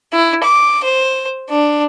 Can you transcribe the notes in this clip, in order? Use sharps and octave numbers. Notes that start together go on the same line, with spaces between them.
E4
D6
C5
D4